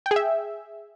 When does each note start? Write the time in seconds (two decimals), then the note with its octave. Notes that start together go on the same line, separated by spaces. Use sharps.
0.06 G5
0.11 G#4
0.16 E5